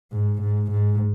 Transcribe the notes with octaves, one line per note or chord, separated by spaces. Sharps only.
G#2
G#2
G#2